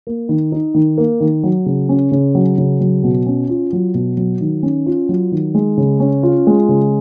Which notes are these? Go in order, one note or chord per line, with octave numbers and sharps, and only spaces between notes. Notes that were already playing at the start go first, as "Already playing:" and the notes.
A#3
D#3
D#4
D#3
A#3
D#3
F#3
C#3
C#4
C#3
F#3
C#3
F#3
B2
C#4
F4
F#3
B2
F#3
D#3
C#4
F4
F#3
D#3
G#3
C#3
C#4
F4
G#3
C#3